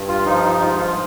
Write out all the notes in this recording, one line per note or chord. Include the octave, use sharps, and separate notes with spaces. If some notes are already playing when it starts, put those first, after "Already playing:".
Already playing: G2
F4
F3 D#4
D#4
G#2 F4
F4